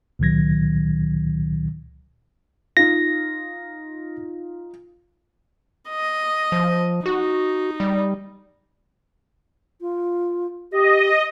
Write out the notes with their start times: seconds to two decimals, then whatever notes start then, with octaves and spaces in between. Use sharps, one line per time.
0.19 C#2 A#2 D#3 F#3 G#6 A#6
2.77 D#4 F4 A#6
5.89 D#5
6.52 F3
7.06 D#4 F#4
7.80 G3
9.81 F4
10.72 G4 D#5